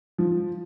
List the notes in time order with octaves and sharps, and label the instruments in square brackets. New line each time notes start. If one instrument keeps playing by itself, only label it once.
[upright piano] F3